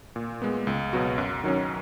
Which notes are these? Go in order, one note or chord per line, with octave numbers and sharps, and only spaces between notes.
A#2
G#3 B3
C#2
B2 F#3 B3 F#4
F#2
D#3 F#3 C#4